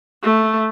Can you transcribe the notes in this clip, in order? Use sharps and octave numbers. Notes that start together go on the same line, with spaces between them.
A3